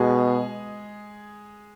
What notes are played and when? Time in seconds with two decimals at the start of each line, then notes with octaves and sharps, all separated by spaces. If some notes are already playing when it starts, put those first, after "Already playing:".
Already playing: B2 G#3 G#4